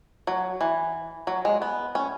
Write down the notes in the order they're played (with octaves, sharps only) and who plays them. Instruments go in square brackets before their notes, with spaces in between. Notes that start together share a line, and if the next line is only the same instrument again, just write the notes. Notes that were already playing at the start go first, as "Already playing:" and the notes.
[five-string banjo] F#3
E3
F#3
G#3
B3
C#4